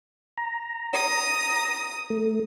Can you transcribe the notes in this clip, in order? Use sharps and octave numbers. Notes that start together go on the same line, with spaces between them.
A#5
D#6
A3